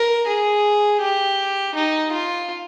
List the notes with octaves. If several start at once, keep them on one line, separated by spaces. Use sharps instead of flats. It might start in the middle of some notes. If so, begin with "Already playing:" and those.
Already playing: A#4
G#4
G4
D#4
F4